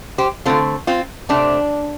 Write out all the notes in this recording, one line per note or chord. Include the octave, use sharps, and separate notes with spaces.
G4 C5
D3 A3 C4 F4 A4
C4 F4
C3 A3 C4 D4